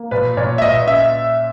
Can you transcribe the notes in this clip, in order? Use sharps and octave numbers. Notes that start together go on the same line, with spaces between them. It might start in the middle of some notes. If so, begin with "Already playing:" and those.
Already playing: A#3
A#2 B4
A#2 C#5
E5
A#2 D#5
D#5
C#4 E5